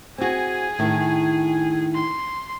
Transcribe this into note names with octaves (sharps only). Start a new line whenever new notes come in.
C4 F#4 G#4 G#5
A2 D#3
C6